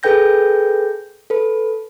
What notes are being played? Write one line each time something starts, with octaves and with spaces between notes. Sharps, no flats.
G#4 A4 B4 G5 G6 A#6
A4 B4